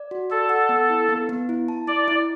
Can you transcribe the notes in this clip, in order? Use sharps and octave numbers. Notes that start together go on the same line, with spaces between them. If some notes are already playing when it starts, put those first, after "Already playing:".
Already playing: D5
F#4
A4 D5
F#5
B3
E4
B3
B3
E4
A5
E4 D5
E4